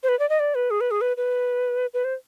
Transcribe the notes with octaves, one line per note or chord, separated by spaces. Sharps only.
C5
B4
D5
D#5
D5
B4
G#4
B4
G#4
B4
B4
B4
C5